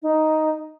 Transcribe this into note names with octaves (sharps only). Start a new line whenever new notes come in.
D#4